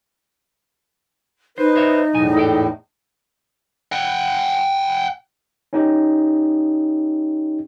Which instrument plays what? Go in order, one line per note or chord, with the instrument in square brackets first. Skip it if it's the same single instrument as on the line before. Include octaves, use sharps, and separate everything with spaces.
[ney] D#4 [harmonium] B4 [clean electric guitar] C5
[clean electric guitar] C5 C#5 E5
[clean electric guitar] B1 G#5 [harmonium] E2 A2
[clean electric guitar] G#2 A4 G5
[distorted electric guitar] F#5 G5
[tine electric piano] C#4 D#4 G4